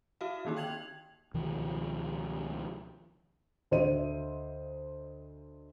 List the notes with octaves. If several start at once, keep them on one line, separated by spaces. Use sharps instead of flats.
E4 F#4 E5 F5
D3 D#3 A#3 D#4 G4
G5 G#6 F7 F#7
C#2 B2 D#3 F3
D2 D4 C5 D#5 E5 D#7